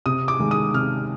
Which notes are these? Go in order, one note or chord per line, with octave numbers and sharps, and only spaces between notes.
C3 D#6
D6
D#3 G#3
D#6
C3 F6